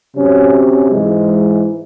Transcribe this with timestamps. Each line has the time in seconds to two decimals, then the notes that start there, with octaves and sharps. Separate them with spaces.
0.15 C3 F#3 C#4
0.90 G#2 E3 G#3